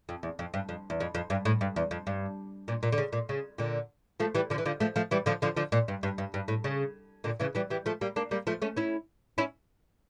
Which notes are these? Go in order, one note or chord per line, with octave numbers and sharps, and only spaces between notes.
F2
E2
F2
G2
F2
E2
F2
F2
G2
A2
G2
E2
F2
G2
A#2
A#2
D3
C#3
A#2
C#3
A#2 D3
F3 A3
E3 G3
D3 F3
E3
D3 F3
F3 A3
F3 A3
E3 G3
D3 F3
D3 F3
D3 F3
A#2
G2
G2
G2
G2
A2
C#3
A#2 D3
C#3 E3
E3 G3
E3 G3
F3 A3
G3 A#3
A#3 D4
G3 A#3
F3 A3
A3 C#4
C#4 E4
C#4 E4